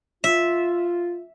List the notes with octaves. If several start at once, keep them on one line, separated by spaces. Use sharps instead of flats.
F4 E5